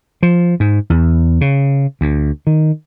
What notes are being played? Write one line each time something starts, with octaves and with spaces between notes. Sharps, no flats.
F3
G#2
E2
C#3
D2
D#3